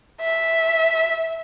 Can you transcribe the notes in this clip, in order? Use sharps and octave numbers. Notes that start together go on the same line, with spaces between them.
E5